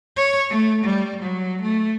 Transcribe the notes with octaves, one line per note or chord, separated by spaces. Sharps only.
C#5
A3
G3
F#3
A3